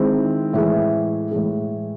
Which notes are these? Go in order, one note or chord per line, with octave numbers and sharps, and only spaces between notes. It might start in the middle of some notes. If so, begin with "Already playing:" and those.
Already playing: D#3 G#3 C4 E4
A2 E3 G#3
A2 E3 G#3